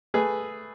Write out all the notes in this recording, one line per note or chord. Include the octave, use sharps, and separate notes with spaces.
A3 G#4 B4